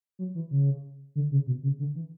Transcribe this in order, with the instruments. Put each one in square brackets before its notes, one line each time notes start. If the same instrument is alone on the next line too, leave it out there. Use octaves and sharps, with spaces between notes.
[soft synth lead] F#3
E3
C#3
D3
C#3
B2
C#3
D3
E3